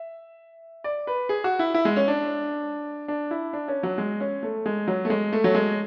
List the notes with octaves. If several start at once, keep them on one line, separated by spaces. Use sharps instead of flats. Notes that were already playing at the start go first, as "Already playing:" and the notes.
Already playing: E5
D5
B4
G#4
F#4
E4
E4
G#3
C#4
D4
D4
E4
D4
C#4
F#3
G#3
C#4
A3
G#3
F#3
A3
G#3
A3
F#3
G#3